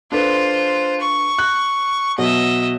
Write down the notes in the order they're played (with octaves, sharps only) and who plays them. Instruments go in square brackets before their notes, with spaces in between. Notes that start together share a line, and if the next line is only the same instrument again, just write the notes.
[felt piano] D4 A4 B4 [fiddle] F4 C5
[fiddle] C#6
[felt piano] F#6
[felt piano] B2 F#3 [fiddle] D#5 E5